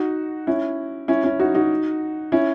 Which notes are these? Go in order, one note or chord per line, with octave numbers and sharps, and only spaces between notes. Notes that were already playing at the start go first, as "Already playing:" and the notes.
Already playing: D#4 F#4
C#4 E4
C#4 E4
C#4 E4
D#4 F#4
D#4 F#4
C#4 E4